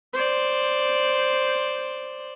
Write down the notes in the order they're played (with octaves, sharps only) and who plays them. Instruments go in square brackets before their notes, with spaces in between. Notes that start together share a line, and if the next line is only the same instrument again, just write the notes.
[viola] C5 D5